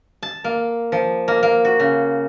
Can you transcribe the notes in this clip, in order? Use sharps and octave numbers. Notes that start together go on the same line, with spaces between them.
A5
A#3
F3
A#3
A#3
F#4
C#3